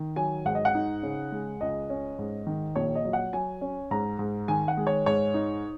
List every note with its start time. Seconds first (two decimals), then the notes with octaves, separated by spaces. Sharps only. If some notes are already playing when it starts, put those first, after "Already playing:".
Already playing: D#3
0.16 F#3 G#5
0.45 G#2 F#5
0.55 D#5
0.65 F#5
0.75 D#4
1.03 C#3
1.32 G#3
1.60 C#2 D#5
1.90 C#4
2.19 G#2
2.47 D#3
2.76 A#1 C#5
2.95 D#5
3.05 F#3
3.13 F#5
3.33 F#3 G#5
3.61 C#4
3.91 G#2 A#5
4.19 G#2
4.48 D#3 G#5
4.68 F#5
4.77 G#3
4.87 C#5
5.06 G#2 C#5
5.34 D#4